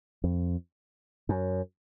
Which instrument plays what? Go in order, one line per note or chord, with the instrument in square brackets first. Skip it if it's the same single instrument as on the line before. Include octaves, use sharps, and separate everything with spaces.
[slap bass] F2
F#2